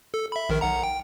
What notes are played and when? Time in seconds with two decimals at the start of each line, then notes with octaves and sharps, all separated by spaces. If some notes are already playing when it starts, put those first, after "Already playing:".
0.14 A4
0.32 E5 B5
0.49 A#1 D#3 A#4
0.61 B1 F#5 A#5
0.84 G5